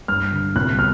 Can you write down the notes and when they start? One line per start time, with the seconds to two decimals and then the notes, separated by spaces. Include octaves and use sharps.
0.08 G2 F6
0.32 D3
0.56 C2 F#6
0.79 B2 F6